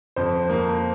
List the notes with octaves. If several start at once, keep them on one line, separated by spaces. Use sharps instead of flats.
F2 C5
A#3